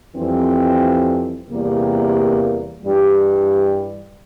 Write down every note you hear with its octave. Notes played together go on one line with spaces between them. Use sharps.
F2 E3 G3 C4
E2 C3 G3 A#3
G2 E3 G3